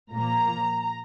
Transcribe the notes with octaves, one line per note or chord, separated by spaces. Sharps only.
A#2 F3 A#3 A#5